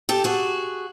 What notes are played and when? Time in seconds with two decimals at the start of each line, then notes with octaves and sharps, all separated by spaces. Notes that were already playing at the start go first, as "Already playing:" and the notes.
0.09 G4 A4
0.24 F#4 G#4